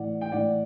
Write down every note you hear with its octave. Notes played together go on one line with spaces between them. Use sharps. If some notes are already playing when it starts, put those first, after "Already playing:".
Already playing: A2 E3 D5 F#5
G5
A2 E3 D5 F#5